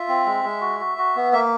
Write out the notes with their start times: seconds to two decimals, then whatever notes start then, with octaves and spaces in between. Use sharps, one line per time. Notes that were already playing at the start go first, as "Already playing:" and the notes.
Already playing: F4 E5
0.08 C4
0.26 G#3
0.44 G#3
0.61 F#4
0.80 F#4
0.98 F#4
1.16 B3
1.33 A#3 E5